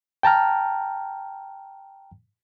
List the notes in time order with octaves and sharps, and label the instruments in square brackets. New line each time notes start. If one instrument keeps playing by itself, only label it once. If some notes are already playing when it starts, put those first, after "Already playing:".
[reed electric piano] G5 A5 A#5 F6